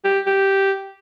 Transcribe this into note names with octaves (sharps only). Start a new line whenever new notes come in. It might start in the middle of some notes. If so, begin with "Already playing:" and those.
G4
G4